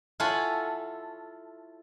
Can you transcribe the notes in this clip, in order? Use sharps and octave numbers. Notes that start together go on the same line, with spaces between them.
E4 F4 A4 C#5 F#5 G#5